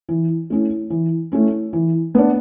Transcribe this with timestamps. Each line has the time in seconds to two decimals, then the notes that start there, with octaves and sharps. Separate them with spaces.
0.09 E3
0.50 A3 C#4 E4
0.90 E3
1.32 A3 C#4 E4
1.73 E3
2.15 B3 D4